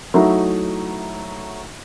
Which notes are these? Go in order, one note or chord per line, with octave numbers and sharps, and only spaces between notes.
F#3 A3 D#4 E4